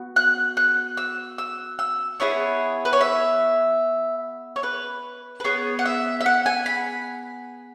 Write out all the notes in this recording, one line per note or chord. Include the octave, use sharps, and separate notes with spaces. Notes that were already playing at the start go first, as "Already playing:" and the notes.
Already playing: B3 F#4
F#6
F#6
E6
E6
E6
B3 E4 G#4 C#5
B4
C#5
E5
C#5
B4
B4
B3 G#4 C#5
F#5
E5
E5
F#5
G#5
B5